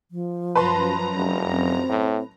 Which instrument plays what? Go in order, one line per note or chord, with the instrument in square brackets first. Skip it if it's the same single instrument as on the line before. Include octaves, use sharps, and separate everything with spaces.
[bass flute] F3
[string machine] F#2 A#5 [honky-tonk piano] B4 A5 C6
[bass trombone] F1
[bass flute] C4
[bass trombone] A2